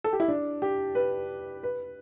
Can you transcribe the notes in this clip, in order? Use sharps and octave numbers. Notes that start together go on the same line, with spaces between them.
A4
G4
E4
D4
G4
B4
B4